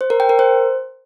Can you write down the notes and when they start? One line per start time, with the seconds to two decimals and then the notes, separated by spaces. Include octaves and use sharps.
0.01 C5
0.10 A#4
0.20 G5
0.29 A#4
0.39 C5